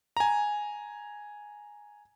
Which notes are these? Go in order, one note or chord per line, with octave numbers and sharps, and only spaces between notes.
G#5 A#5